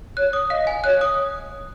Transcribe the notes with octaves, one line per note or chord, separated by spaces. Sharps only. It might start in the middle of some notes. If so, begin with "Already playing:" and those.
C#5 F#6
D#6
D#5 F5
G#5
C#5 F#6
D#6